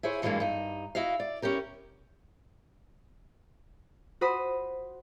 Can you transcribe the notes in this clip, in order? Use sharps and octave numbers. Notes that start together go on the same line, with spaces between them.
E4 G#4 C5 C#5
G2 E3 F#3 G#3 A#3 D4
G2 D#4
E4 F#4 D#5 F5
D5
C#4 E4 G4 A#4
F#4 C5 B5 D#6